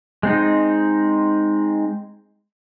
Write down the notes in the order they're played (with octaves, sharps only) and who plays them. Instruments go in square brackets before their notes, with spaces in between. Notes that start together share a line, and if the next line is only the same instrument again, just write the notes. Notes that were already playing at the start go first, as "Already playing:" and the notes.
[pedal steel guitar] G#3 C4 D#4